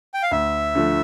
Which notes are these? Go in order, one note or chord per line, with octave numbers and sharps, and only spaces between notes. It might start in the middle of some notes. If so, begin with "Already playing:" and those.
G5
F5
D2 E5
D3 F3 A3